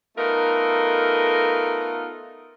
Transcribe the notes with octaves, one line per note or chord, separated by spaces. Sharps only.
A3 B3 D#4 F4 A4 A#4